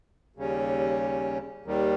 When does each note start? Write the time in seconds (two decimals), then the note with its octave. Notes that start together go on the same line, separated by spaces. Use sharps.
0.36 D#2 C#3 G3 C#4
1.65 D#2 D#3 G3